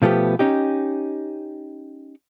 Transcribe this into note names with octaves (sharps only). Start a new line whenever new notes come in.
B2 F3 A3 B3 G4
C#4 D#4 G4